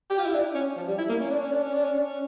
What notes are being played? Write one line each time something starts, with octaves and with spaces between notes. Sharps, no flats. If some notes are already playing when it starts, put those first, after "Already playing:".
G4
F4
E4
D4
C#4
F3
G3
E4
A#3
C#4
D4
C#4
D4
C#4
D4
C#4
D4
C#4